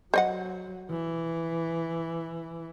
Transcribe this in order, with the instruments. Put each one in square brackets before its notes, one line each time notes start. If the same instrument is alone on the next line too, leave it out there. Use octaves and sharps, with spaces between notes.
[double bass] F#3 [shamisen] C5 D#5 F#5
[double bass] E3